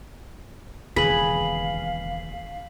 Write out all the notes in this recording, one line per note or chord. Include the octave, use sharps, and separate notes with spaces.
E1 D#2 C#3 G#4 B4 F5 B6 F#7